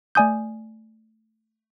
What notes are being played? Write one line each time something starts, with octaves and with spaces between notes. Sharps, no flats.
A3 D5 G#5 D#6 G6